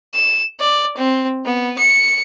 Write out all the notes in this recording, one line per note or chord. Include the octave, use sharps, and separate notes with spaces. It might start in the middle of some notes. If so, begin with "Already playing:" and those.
E7
D5
C4
B3
C#7